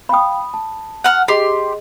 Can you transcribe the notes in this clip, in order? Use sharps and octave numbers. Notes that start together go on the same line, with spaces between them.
F5 G5 B5 D#6
A5
F#5 F6
G4 G#4 D#5 C6